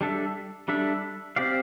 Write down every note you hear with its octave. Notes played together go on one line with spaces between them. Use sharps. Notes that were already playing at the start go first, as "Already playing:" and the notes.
G3 D4 A4 E5
G3 D4 A4 E5
C4 G4 D5 F5